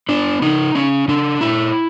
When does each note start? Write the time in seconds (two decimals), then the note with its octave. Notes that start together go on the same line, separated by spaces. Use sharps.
0.09 B3 D4
0.42 C#3 D#4
0.75 C#3 C#4
1.08 C#3 D4
1.41 A#2 E4